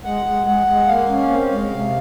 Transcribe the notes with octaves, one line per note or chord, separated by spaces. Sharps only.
G#3 F#5
G#3
G#3 F#5
G#3
A#3 F5
C#4
C4
G#3
C3